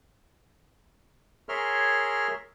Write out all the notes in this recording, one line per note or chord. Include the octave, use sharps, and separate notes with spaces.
G#4 A#4 C#5 E5 C6 F6